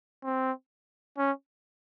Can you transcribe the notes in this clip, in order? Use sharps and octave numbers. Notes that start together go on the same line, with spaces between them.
C4
C#4